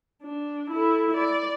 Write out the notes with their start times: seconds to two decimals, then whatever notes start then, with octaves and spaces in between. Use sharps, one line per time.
0.22 D4
0.71 E4 A4
1.17 D5